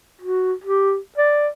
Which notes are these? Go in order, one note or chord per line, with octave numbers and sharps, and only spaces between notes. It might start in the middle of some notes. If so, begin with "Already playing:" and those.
F#4
G4
D5